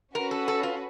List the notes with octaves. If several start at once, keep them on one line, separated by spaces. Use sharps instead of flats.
C#4 F#4 A#4 B4
A4
A4
F4